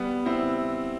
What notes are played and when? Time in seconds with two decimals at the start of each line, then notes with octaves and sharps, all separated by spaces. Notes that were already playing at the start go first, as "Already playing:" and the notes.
Already playing: G3 B3
0.25 C4 E4